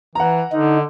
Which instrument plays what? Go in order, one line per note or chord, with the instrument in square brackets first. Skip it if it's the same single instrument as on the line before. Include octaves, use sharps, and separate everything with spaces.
[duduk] E3 [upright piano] F#5 A#5
[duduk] D3 [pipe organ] D#4